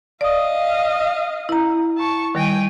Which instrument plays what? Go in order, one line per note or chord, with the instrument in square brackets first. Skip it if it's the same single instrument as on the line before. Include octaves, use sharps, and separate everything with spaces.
[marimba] D5 D#6 [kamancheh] D#5 F5
[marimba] E4 A#5
[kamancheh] A5 C#6
[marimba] D#3 G3 [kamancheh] G5 G#5